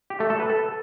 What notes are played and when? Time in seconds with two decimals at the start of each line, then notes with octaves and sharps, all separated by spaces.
0.10 G4
0.20 A3
0.30 A4
0.40 B4
0.50 A4